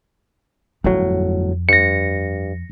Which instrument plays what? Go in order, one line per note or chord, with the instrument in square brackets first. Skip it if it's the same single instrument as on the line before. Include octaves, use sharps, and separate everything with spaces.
[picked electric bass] G1 A2 F#3 [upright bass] F2
[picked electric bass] G2 [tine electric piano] A#6 C#7